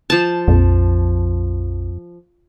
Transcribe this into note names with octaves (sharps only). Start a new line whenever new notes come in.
F3 A5
A#1 F2